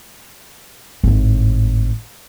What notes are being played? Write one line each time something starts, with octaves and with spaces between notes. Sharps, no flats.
G#1 A2